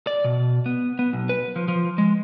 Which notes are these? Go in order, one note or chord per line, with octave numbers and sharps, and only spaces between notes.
D5
B2
B3
B3
B1
B4
F3
F3
G#3